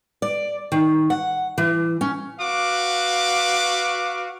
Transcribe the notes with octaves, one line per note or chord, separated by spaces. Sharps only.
D5
D#3
F#5
E3
C#4
F#4 B4 F5 D6